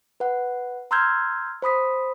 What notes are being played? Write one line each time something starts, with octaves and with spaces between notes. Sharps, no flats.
B4 F#5
A#5 C6 E6 F6 G6 G#6
C5 B5 D#6 B6